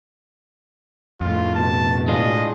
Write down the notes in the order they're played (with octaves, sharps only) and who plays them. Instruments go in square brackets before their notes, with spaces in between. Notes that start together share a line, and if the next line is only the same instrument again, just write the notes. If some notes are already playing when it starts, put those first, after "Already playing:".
[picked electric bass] F2 A2 [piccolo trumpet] F4
[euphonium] B2 [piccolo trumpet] A5
[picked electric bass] A2 [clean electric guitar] G#3 D4 F4 [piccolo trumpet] D#5